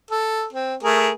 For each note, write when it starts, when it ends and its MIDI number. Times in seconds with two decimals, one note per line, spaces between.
0.11 0.46 69
0.53 0.75 60
0.83 1.11 57
0.83 1.11 68
0.83 1.11 70